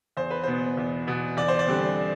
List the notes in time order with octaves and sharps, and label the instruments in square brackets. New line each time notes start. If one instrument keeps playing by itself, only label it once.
[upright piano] E2 C5
B4
B2 B3 C5
E2
B2 B3
E2 D5
C5
D5
D3 G3 C4